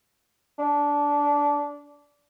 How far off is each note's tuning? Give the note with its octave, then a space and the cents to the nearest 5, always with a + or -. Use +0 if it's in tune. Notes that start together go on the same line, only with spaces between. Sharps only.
D4 -15